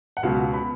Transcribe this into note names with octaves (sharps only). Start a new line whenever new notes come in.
F#5
C#2 B2 F#3 F5
B5